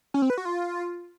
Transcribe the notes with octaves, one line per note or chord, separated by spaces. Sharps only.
C#4
C4
B4
F#4
F4